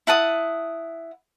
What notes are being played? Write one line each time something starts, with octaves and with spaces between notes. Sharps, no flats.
E4 F#5 A5 D#6